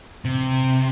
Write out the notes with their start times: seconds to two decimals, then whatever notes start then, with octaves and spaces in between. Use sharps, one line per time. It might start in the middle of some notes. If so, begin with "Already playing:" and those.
0.25 C3